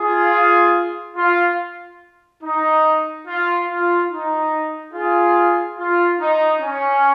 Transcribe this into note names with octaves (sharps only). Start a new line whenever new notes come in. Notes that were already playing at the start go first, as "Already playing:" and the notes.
Already playing: F4 G#4
F4
D#4
F4
F4
D#4
F4 G#4
F4
D#4
C#4